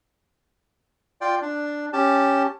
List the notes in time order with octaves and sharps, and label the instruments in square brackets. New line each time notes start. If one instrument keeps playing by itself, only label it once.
[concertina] F4 D5 G5
D4
C#4 G4 A5